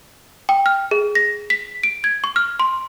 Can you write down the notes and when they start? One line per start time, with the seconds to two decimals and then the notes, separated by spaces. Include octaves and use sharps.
0.49 G5
0.66 F6
0.91 G#4
1.15 A#6
1.50 B6
1.84 D7
2.04 G#6
2.24 C#6
2.36 F6
2.60 C6